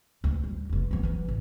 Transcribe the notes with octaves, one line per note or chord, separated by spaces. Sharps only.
D2
G3
F1 E2
F3 B3
E3 F#3
D#1 A1